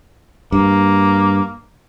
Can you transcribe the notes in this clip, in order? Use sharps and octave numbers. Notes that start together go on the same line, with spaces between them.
G2 A#3